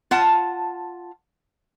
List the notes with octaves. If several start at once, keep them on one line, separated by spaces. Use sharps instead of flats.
F4 F#5 A5